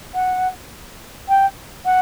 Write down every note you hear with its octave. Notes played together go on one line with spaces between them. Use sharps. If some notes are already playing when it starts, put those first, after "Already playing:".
F#5
G5
F#5